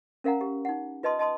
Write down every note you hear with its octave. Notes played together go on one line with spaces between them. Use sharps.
C#4 A#4 F5 F#5 A#5
G4
D#4 F#5
F4 B4 D#5 A5 C6 D#6
D#5 A5 C6 D#6